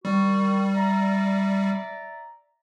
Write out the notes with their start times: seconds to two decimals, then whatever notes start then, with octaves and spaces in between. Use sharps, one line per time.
0.05 D#3 G3 F#4
0.75 D5 E5 A#5